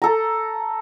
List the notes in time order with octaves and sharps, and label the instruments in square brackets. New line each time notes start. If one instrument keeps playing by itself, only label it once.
[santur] A4 A#5